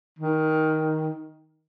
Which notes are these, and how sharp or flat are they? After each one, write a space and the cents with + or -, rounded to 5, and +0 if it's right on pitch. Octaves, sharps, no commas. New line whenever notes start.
D#3 +10